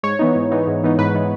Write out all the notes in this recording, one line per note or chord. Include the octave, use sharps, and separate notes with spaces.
G#2 C#5
E3 B3 D#4
G#2
E3 B3 D#4
G#2
E3 B3 D#4
G#2 B4
E3 B3 D#4